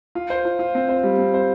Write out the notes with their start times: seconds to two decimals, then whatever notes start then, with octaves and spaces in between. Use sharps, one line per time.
0.15 F4
0.30 C5
0.45 F4
0.59 F4
0.75 C4
0.89 C5
1.03 G3
1.19 C4
1.34 C5